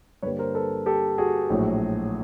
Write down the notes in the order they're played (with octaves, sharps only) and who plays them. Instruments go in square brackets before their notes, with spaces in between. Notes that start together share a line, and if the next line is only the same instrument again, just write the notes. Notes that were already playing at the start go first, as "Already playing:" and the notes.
[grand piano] G2 D3 G3 A#3 B4 C#5
A#4 C5
A4 B4
G4 A4
F#4 G#4
A#1 A2 F#3